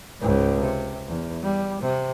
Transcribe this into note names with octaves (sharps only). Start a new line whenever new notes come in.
C#2 G#2
C3
E2
G3
C3